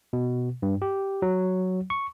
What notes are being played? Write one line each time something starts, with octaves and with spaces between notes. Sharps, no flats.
B2
G2
G4
F#3
C#6